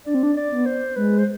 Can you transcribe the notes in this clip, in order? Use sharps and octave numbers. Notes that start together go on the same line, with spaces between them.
D4 D5
C4
D4
D5
B3
C5
G#3 B4
C5